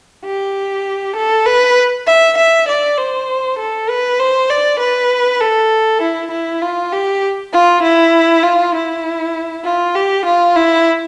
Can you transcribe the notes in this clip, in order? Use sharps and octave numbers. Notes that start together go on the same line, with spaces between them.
G4
A4
B4
E5
E5
D5
C5
A4
B4
C5
D5
B4
A4
E4
E4
F4
G4
F4
E4
F4
E4
F4
G4
F4
E4